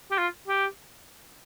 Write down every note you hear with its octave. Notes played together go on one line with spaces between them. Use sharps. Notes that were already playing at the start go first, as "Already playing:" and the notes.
G4
F4
G4